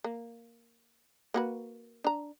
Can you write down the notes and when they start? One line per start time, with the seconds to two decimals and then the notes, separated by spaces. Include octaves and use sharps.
0.04 A#3
1.34 A#3 F#4 B4
2.04 D4 A#5